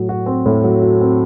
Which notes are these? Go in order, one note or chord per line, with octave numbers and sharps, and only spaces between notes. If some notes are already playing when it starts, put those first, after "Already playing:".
Already playing: A2 F#3
F#4
C4
A2
F#3
F#4
C4